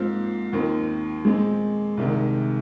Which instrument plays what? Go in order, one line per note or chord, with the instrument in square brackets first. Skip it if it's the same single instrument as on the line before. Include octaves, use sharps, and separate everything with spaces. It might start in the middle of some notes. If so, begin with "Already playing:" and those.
Already playing: [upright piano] G#2 F3 C4 F4 [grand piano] A#3
[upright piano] D#2 D#3 C4
[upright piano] A#2 F3 C4 [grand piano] G#3
[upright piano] C2 C3 D#3